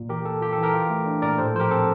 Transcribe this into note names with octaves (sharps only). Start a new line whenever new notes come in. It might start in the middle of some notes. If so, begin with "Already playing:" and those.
Already playing: A#2
E3 G4 A#4
A#3 A4
F4 G4
A4
E3
G4 A#4
F4
A3
D4
A#2 A#4 D5
A2 A4 C5
F3 C5
G4 A#4
C4 A4